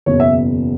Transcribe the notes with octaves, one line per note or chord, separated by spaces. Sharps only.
F#1 E2 B2 C#5
E5